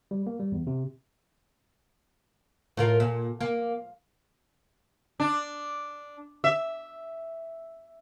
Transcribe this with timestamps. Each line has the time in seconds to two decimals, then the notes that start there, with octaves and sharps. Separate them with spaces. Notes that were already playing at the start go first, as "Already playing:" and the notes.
0.11 G3
0.27 A#3
0.40 G3
0.52 E2
0.67 C3
2.77 A2 F4 A#4
3.00 A#2
3.41 A#3
5.20 D4
6.44 E5